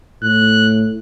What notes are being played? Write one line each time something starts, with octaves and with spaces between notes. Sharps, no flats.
A2 F#6